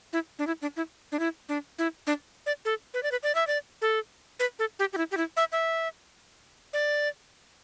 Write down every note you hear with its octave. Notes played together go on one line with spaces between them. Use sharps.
E4
D4
E4
D4
E4
D4
E4
D4
E4
D4
D5
A4
B4
D5
B4
D5
E5
D5
A4
B4
A4
G4
G4
E4
G4
E4
E5
E5
D5